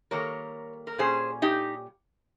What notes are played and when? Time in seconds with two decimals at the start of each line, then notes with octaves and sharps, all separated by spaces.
0.11 D#3 G3 A#3 A#4 C#5
0.87 A#4
0.98 A#2 G3 C#4 G#4 C5
1.42 D#4 G4